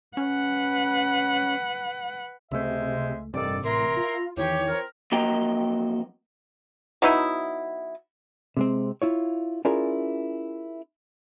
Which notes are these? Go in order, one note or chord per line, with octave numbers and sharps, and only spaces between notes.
C#4 B4 F#5
C#2 C3 G#3 A3 C5 E5
A1 G2 C3 D#3 A4 D5
A2 E4 A#4 A#5 C6
F4
E2 D#3 E3 G4 C#5
C4 F4 A#4
F2 F#3 A#3 D#5 G5 A#5
F#3 B3 D#4 E4
C3 G#3 C4
E4 F4 C#5
C#4 E4 F4 G#4 A#4 D5